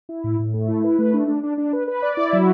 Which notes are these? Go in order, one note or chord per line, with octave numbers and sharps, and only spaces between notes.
E4
A2
A2
A3
E4
B4
A3
D4
D4
D4
D4
B4
B4
D5
E4
F#3